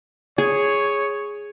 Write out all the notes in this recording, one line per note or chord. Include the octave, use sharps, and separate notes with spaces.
G#4 C#5